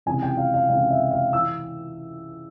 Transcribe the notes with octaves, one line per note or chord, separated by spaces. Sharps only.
C#2 C3 E3 G#5
G5
F5
F5
C#2 C3 E3 F5
E5
F5
E3 E6